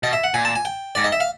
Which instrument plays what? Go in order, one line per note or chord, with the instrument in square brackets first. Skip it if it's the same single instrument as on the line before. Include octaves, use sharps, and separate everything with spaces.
[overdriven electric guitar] B2 [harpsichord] D#5
[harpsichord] E5
F#5
[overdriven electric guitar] A#2 [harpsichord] G#5
[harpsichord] A5
G#5
G5
[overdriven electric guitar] G#2 [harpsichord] D5
[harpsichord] D#5
E5
F5